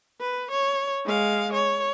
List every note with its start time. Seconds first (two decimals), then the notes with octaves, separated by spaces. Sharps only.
0.21 B4
0.51 C#5
1.06 G#3 F5
1.53 C#5